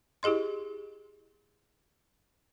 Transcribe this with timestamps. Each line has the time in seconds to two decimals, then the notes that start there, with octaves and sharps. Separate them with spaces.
0.23 E4 G4 G#4 D#5 C6